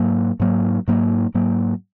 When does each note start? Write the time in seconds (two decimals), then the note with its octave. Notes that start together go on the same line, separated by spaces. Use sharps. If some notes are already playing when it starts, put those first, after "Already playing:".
Already playing: G#2 F#3 A#3
0.40 G#2 F#3 A#3
0.88 G#2 F#3 A#3
1.35 G#2 F#3 A#3